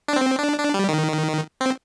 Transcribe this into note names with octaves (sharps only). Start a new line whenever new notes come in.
D4
C4
D4
D4
G3
D#3
C4